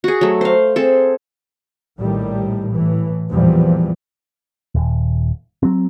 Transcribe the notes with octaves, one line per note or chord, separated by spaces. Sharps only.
F#4 G#4
F#3 A3
C5 F5
C4 G#4 A4
A#1 A2 D#3 G3
A2 E3
E2 A#2 E3 F3 G3
D#1
F#3 C4